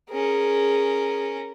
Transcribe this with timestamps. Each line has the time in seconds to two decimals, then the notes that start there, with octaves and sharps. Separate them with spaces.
0.11 C#4 G#4 A#4